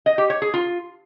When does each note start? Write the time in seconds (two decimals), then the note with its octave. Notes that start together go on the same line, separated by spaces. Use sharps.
0.06 D#5
0.18 G4
0.30 C#5
0.42 G#4
0.54 F4